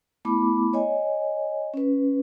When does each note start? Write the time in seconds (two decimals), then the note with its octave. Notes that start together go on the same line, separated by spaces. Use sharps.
0.25 A3 B3 E4 B5 D6
0.73 C#5 D#5 G#5
1.74 C#4 B4